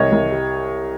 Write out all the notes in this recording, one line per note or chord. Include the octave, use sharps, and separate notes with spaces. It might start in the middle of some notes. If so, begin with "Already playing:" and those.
Already playing: C2 C#5 D#5
C2
G3